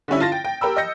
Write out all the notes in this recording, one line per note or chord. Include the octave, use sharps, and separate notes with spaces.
D3 G3 C#4 E4
F4 A5 A6 A#6
G5
G5
G4 A#4 G5 B5 E6
D#5 E6 G6 A#6 C#7